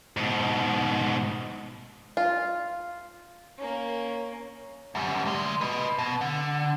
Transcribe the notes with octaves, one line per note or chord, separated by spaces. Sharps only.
G#2 B2
F4
A#3 C#4
F#2 G3
D2 G#3
B4 D#5
B2
D3